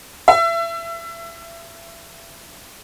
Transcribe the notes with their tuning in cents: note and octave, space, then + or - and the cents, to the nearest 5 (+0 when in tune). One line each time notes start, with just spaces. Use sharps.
E5 +30